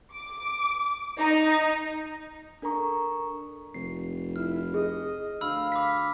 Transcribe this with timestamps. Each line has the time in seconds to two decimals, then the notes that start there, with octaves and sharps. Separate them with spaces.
0.13 D6
1.18 D#4
2.62 D4 A4 A#4 A#5 C#6
3.74 F1 C7
4.36 E4 F6
4.74 G#4 D#5
5.41 D2 F5 B5 E6 F6
5.72 D6 F6 B6